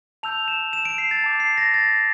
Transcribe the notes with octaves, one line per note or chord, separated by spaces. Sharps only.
A5 E6 G6 F7
E7
E7
D7
C7
A6
A5 D6 G6
C7
A#6
A6